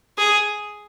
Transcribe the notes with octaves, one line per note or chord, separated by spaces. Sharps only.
G#4